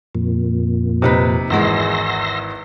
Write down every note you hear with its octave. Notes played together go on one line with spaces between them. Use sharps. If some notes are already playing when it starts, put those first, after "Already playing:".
F2 A#2
C3 D#4 B4
G#1 E2 G#3 E5 C6 A#6